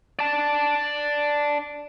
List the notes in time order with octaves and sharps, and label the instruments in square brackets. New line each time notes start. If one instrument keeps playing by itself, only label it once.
[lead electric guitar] D5 A5